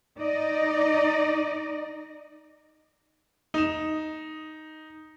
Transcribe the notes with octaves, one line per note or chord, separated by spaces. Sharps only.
D#4 D5 D#5
D#4 E7